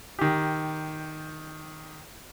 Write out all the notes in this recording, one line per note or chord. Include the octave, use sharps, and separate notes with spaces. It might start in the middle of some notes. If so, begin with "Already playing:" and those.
D#3 G4